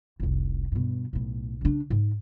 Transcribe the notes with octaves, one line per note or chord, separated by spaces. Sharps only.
F1 C2
G2 B2
B1 A2
C#3 D4
G#2